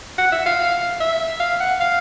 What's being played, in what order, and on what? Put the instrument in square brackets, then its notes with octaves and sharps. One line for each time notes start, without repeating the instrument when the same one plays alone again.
[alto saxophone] F#5
E5
F5
F5
E5
F5
F#5
F5